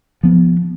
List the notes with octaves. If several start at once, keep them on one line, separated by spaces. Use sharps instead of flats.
F3 B3